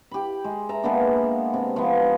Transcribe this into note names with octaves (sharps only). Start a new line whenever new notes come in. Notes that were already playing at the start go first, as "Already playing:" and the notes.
G4 B5
G#3
E5 A5 A#5
G#3 A#3 B3 D4
C3
F3 B3